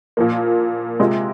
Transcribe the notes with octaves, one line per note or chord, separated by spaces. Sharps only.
A#2 F3 A#3
C3 G#3 F4